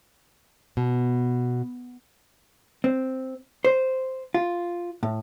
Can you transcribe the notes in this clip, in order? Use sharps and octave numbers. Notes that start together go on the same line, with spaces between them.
B2
C4
C5
F4
A2